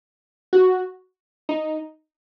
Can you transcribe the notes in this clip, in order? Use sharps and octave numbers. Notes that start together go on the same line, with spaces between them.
F#4
D#4